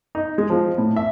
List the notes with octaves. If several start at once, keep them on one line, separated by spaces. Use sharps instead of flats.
D#4
G#3
F3
A2
E5